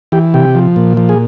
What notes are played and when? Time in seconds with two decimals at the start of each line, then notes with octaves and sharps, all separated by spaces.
0.12 E3 G4
0.34 C3 G4
0.55 F3
0.76 A#2
0.97 F3
1.09 G#4